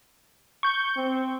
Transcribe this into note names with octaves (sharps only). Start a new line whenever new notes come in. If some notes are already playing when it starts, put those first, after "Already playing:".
C#6 G6
C4